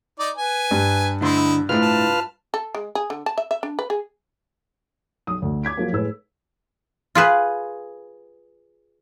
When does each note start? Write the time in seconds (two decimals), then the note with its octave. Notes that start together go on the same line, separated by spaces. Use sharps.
0.19 D#4 D5
0.36 B4 G#5
0.71 G2
1.21 D2 D3 D#4 E4 C6
1.69 C2 A2 G#3 F4 B4 F6
1.81 A5
2.54 A4
2.75 G#3
2.95 G#4
3.10 D3
3.26 A5
3.38 E5
3.51 E5
3.63 D4
3.79 B4
3.90 G#4
5.27 B1 D#6
5.42 D2
5.63 D6 G#6 B6 D7
5.77 F3 F#3 A#3
5.93 A2 G#3 A4 B4 E6
7.15 F4 G#4 B4